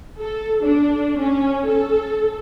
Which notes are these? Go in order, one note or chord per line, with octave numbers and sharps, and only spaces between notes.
A4
D4
C#4
A4